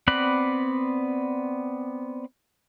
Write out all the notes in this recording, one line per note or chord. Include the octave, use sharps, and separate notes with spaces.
B3 C4 D5 B5 F#6